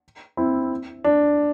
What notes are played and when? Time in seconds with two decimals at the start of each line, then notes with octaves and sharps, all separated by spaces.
0.37 C4 E4
1.04 D4